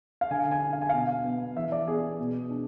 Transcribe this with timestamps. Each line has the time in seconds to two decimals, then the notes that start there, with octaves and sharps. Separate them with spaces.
0.21 F5
0.31 D3 G#5
0.51 G#5
0.62 D4
0.73 F5
0.81 G#5
0.89 B2 F5
1.25 B3
1.56 E3 E5
1.72 D5
1.88 B3 G#4
2.19 B2
2.50 D4